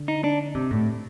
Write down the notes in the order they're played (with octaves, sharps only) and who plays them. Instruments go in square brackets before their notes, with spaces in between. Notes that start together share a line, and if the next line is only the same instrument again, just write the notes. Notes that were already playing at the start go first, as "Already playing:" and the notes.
Already playing: [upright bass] D3
[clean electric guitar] D#4
D4
[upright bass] C3
A2